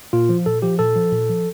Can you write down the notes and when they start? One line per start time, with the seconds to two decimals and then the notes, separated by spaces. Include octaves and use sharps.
0.13 A#2 F4
0.29 F3
0.46 A#2 A4
0.62 F3 G4
0.79 A#2 A4
0.96 F3
1.13 A#2
1.29 F3